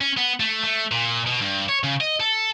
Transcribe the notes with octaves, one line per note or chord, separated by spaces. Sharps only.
C#4
B3
A3
A3
A#2
B2
G2
C#5
C#3
D#5
A4